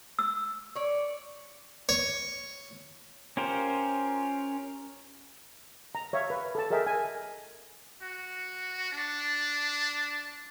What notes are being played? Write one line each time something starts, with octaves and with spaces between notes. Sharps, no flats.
E6
C#5 D5
C#5
C#4 F4 G4 A#4 C5
A#5
C#5 E5 F5
B4
A4 A5
G#4 A#4 D#5 E5 G5
G#5
F#4
D4